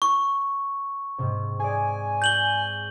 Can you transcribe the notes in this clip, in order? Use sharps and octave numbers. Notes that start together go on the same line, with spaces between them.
C#6
G#2 C3
G#4 D5 G#5
G6 F#7 G7